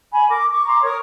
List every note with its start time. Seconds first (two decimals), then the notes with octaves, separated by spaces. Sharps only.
0.12 G#5 B5
0.28 A#4 D6
0.50 C#6 D6
0.66 A#5 C6 D6
0.82 A#4 C#5 C#6 D#6